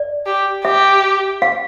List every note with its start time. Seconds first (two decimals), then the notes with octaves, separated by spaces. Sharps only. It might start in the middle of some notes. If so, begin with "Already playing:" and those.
Already playing: D5
0.26 G4
0.65 G4 E5
1.42 F5